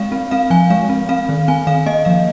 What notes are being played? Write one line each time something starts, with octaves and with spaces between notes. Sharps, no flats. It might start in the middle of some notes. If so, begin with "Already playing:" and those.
Already playing: G#3 C4 F5
C4
C4 F5
F3 G#5
G#3 F5
C4
C4 F5
D#3
C4 G#5
D#3 F5
A#3 D#5
F3 F5